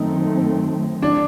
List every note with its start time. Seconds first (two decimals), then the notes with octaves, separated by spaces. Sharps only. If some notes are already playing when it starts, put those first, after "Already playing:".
Already playing: F#2 D#3 F#3 A3 C4 D#4
1.02 D4